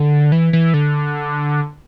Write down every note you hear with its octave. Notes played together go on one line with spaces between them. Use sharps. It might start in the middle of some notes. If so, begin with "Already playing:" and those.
Already playing: D3
E3
E3
D3